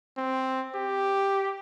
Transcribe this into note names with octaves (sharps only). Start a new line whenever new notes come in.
C4
G4